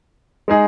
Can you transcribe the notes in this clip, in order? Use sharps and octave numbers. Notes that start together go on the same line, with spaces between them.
G#3 D#4 G#4